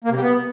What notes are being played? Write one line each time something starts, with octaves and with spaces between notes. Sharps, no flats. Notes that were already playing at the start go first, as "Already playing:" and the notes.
A#3
C3
G3
B3